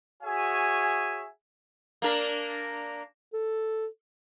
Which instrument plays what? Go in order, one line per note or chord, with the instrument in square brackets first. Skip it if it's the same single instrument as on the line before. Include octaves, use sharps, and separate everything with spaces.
[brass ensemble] F#4 G#4 C#5 E5 G#5
[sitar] A#3 D4 A#4
[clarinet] A4